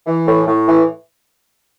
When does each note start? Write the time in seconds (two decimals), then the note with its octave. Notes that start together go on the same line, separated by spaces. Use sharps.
0.07 E3
0.27 A2
0.46 A2
0.67 E3